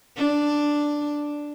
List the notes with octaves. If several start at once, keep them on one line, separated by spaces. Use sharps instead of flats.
D4